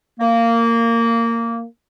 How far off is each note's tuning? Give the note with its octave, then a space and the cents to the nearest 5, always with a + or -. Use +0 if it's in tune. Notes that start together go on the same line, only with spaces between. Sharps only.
A#3 -15